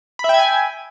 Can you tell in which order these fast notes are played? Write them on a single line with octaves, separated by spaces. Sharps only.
B5 E5 G5 G#6 G#5